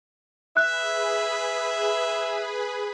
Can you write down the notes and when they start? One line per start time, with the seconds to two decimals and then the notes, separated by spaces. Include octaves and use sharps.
0.57 G#4 B4 E5 B5 F#6